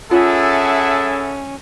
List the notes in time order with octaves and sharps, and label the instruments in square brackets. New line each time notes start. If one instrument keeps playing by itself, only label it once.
[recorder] C#4 [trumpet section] E4 G#4 A4 [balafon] F4 [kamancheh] E5 F#5